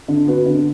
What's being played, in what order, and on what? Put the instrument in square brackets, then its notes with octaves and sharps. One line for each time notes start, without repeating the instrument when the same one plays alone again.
[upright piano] D3
B3 F#4 B4
D3